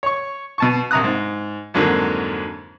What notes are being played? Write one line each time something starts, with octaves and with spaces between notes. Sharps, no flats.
C#5 C#6
B2 A5 C#6
A#1 C3 A#5 D#6 F#6
G#2
F2 G#2 D3 F#3 A#3